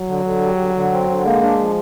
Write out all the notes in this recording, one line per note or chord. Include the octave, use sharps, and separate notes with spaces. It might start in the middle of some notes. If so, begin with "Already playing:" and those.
Already playing: F#3
D3
D3
G3
D3
D3
C4
D3
G#3 A#3
D4
F3